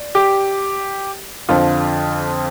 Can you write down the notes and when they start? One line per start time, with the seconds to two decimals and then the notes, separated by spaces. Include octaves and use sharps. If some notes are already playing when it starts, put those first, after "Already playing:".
Already playing: D5
0.15 G4
1.49 F2 D3 F3 F4